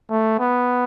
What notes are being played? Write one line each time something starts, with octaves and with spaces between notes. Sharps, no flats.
A3
B3